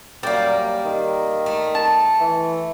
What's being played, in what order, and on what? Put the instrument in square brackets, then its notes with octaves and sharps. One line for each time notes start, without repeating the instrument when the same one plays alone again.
[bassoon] F#2 [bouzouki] G3 A#3 [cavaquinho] D5
[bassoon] D#3
[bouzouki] A3
[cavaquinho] A5
[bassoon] E3